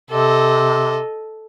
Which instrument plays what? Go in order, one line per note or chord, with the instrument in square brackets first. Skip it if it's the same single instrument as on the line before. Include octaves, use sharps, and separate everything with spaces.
[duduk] C3 [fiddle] A4 D#5